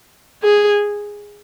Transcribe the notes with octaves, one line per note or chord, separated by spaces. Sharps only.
G#4